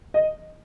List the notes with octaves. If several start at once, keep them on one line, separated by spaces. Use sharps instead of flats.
D#5